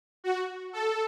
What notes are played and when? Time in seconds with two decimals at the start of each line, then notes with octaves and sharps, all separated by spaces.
0.24 F#4
0.73 A4